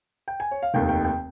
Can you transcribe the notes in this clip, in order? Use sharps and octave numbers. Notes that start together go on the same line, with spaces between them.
G5
G#5
C#5
F5
F1 D#2 D#3 G5
G5
G5